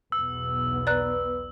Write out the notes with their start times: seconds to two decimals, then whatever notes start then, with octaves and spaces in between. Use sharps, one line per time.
0.12 B1 E2 B3 E6
0.87 B4 D5 A#5 F#6